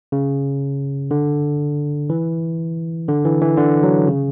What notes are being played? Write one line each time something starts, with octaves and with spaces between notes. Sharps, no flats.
C#3
D3
E3
D3
E3
E3
D3
F#3
C#3